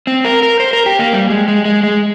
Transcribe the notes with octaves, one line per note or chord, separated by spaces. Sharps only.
C4
A#4
A#4
C5
A#4
G4
A#3
G3
G#3
G#3
G#3
G#3